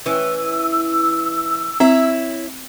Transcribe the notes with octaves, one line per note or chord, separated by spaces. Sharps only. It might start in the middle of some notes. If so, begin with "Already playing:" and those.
E3 C#4 E6
C4 E4 C#5 E5